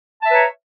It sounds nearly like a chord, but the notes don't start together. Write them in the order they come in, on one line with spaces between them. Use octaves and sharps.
A5 E5 B4 A#5 C#5